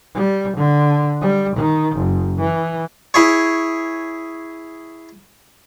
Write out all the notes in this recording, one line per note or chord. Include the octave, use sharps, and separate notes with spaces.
G3
D3
G3
D#3
F#1
E3
E4 G#4 C#5